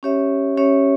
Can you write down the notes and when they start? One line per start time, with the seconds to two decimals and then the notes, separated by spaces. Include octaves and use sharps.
0.03 C#4 G4 C#5 E5
0.57 C#4 G4 C#5 E5